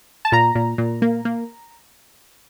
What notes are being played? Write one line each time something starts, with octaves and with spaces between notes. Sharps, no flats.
A5
A#2 A#5
A#2
A#2
A#3
A#3